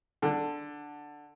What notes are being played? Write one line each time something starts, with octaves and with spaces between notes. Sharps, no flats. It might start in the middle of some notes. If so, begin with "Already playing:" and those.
D3